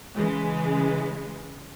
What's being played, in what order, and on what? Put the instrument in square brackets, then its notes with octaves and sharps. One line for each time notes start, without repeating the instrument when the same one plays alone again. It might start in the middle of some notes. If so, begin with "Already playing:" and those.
[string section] C#3 E3 G#3